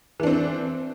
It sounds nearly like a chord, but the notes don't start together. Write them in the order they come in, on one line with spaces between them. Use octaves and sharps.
E3 D4 C4